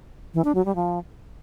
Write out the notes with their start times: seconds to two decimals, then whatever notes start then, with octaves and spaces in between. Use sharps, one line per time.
0.34 E3
0.45 D4
0.55 F#3
0.65 G3
0.76 F3